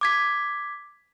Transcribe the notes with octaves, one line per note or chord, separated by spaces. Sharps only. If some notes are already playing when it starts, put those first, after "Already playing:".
D6 G#6 B6